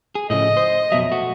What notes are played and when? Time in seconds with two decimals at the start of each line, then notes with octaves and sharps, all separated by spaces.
0.15 G#4
0.30 A2 C#3 F3 A3 D#5
0.57 C5 D#6
0.92 F2 B2 F#3 E5
1.11 A3 F#4